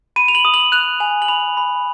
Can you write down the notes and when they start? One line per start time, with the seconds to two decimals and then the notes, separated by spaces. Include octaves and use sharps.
0.16 B5 D#7
0.28 F7
0.35 F#7
0.45 D#6
0.54 F#7
0.72 F#6 F7
1.00 G#5 F7
1.22 F#7
1.28 B5 F7
1.57 B5